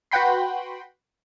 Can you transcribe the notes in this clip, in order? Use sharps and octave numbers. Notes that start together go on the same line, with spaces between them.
F#4 B4 F#5 G5 B5 C6